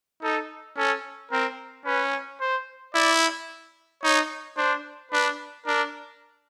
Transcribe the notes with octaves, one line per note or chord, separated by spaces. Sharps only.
D#4 A4
C#4 A4
C4 A#4
C#4 B4
C5
E4 D5
D#4 C#5
D4 C5
D4 B4
D4 A#4